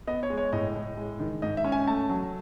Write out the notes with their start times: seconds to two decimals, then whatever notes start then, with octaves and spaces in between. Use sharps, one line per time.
0.07 B3 D#5
0.23 C#5
0.30 G#3
0.38 C#5
0.53 A2 D#5
0.75 A2
0.97 G#3
1.20 D#3
1.42 G#2 D#5
1.57 E5
1.64 C#4
1.72 G#5
1.87 A3 A5
2.09 F#3